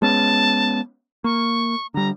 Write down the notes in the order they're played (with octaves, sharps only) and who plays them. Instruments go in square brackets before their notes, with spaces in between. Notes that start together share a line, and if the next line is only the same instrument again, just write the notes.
[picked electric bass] G#3 B3 C#4 [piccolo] A5
[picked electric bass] A#3 [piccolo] C#6
[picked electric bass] D3 G3 [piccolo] A#5